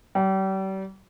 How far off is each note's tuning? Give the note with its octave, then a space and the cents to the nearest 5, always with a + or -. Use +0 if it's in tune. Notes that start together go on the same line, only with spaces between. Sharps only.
G3 -35